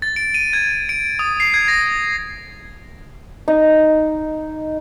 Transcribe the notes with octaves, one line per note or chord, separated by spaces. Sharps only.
A6
D7
D#7
G#6
D7
D#6
C7
G#6
A#6
D#4